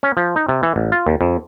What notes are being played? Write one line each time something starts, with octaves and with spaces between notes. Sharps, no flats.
C#4
F3
D#4
C3
E3
A1
F4
D#2
F2